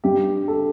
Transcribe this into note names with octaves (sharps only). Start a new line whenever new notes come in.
G2 G4
A4